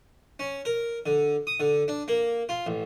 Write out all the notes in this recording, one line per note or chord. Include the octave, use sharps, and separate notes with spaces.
C#4
A#4
D3
D#6
D3
D4
A#3
F4
A1